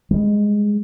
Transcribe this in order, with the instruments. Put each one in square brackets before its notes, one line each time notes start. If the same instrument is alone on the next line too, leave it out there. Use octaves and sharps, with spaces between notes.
[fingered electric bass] G3 G#3